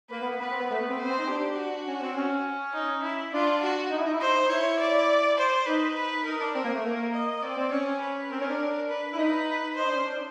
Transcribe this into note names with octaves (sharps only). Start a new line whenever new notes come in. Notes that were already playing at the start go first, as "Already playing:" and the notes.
A#3 B4
B3
A#3
B3 B4
C4
B3
A3 B4
B3
C4
B3 C5
C4
D#4
D4 G4
F#4
C#4
C4
C#4
D#4
E4
D4 F4
F#4
D#4
E4
D#4
E4
D#4 C5
E4 C#5
D5
C5
D#4 B4
B4
D#4 A#4
D4
C4 A#4
A#3
A3
A#3
D#5
C4 D5
C4
C#4 C#5
B4
C4 A#4
C#4
D4
B4
E4
D#4 B4
D#4 C5
D4
C#4
D4
D#4